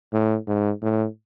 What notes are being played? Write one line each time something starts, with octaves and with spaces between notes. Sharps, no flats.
A2
G#2
A2